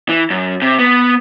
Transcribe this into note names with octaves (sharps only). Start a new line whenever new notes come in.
E3
F#2
C3
B3